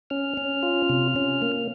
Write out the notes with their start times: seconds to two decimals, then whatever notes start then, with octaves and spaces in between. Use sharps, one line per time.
0.10 C#4 F6
0.37 C#4
0.63 F4
0.89 C3
1.16 C#4
1.42 A#3